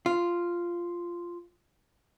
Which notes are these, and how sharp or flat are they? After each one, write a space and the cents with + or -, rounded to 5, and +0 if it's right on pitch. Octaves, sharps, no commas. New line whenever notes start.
F4 -5